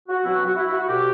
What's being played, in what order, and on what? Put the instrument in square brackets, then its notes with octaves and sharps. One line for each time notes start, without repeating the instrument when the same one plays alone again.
[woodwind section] F#4
B2 F#3 C4 E4
F#4
F#4
E4
F#4
C2 B2 A3 G4